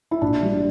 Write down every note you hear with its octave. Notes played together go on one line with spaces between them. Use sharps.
E4
A#1 D4
G3